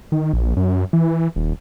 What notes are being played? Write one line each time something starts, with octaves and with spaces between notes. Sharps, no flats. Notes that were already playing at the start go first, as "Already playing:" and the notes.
D#3
A#1
F#2
E3
D#1